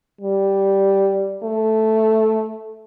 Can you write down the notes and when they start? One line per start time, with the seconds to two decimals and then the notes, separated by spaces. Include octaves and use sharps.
0.21 G3
1.43 A3